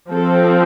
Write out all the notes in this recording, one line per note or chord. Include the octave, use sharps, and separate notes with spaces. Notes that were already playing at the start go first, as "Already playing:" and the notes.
F3 C4 A4